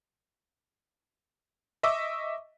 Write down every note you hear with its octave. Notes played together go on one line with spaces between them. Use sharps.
D#5 E5 C#6 D6 E6